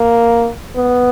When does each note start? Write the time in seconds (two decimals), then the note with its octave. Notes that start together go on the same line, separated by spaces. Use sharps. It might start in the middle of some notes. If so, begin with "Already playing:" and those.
Already playing: A#3
0.75 B3